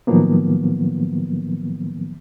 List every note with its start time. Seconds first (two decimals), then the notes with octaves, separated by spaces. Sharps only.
0.07 A2 D#3 F3 F#3 A#3 B3